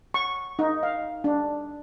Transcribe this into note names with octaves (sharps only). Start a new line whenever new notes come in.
C#6
D#4
F5
D4